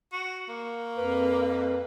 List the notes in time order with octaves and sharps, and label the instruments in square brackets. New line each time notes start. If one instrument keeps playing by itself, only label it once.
[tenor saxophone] F#4
A#3
[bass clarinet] F2 [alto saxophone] B4